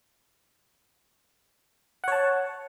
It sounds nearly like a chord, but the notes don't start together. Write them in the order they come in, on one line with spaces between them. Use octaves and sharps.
F#5 C#5 A5